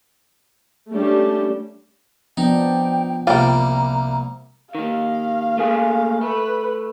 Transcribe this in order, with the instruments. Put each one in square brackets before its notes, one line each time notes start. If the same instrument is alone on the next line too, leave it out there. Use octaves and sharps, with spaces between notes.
[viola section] G3 A3 C#4 D4 G4
[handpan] F3 B3 D4 [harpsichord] D#4 [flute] G5
[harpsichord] C2 A#2 G3 [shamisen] F4 G5 [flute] A#5
[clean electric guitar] D#3 A#3 [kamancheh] F5
[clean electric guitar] A3 A#3 G#4
[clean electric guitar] A3 [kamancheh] B4